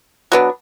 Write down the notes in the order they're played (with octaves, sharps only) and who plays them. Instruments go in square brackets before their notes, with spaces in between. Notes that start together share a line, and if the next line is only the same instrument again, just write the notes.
[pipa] F#3 B3 D4